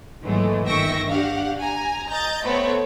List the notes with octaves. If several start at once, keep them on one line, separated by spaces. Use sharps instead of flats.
D#2 G#2 E3 F#3 G#3 A3
G1 D#3 E5 G5 C#6 A#6
D4 G4 F5 F#5
G#5 A#5
D#5 A#5 G6 A6
A3 B3 C4 C5 C#5